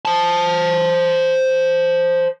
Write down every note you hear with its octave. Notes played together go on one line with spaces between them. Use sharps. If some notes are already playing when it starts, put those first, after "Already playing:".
C5 A5